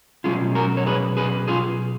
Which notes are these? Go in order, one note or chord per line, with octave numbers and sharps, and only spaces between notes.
B2 F#3 C#4 F4 G#4
F#4 A#4
C#5
G#4 B4
G#4 B4
F4 G#4